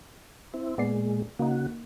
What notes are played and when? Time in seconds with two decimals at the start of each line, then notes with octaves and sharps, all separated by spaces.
0.54 C4 E4
0.78 A#2 G#3 B3 D5 C7
1.39 C#3 A#3 D#4 F#4